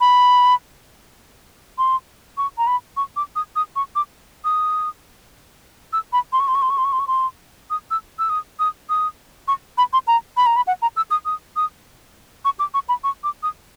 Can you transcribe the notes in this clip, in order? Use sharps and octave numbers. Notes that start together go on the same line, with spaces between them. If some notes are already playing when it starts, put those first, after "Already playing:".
B5
C6
C#6
A#5
B5
C#6
D6
D#6
D#6
C#6
D6
D#6
E6
B5
C6
C#6
C6
C#6
C6
C#6
C6
C#6
C6
C#6
C6
D#6
E6
E6
D#6
D#6
D#6
C#6
B5
C6
A#5
B5
A#5
B5
F#5
A#5
E6
D#6
D#6
D#6
C#6
D6
C#6
B5
C#6
D6
D#6